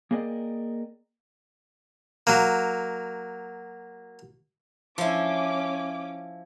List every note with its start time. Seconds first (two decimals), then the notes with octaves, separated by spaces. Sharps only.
0.11 A#3 G#4 A#4 D5 D#5 G5
2.27 F#3 A#3
4.98 F3 C#4 E4 D6